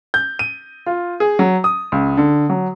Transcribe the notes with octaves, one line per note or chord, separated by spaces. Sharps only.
G6
D#7
F4
G#4
F#3
D#6
C#2
D3
F#3